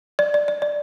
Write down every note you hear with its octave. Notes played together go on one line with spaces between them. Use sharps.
D5
D5
D5
D5